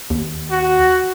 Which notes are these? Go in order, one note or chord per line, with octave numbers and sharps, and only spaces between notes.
D#2
F#4